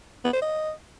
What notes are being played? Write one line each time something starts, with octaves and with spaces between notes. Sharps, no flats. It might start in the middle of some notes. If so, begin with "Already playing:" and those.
B3
C5
D#5